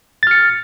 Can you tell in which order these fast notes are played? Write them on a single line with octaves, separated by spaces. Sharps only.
A6 F6 C#7